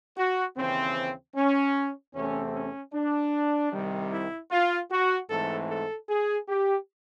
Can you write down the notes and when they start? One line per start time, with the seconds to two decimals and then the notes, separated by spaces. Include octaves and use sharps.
0.17 F#4
0.56 D#2 C#3 E3 C4
1.36 C#4
2.14 E2 C3 E3 A3 C4 C#4
2.54 C#4
2.94 D4
3.72 C2 C3 D#3 G3
4.12 E4
4.52 F4
4.91 F#4
5.30 G#2 E3 A3 C4 A4
5.69 A4
6.10 G#4
6.48 G4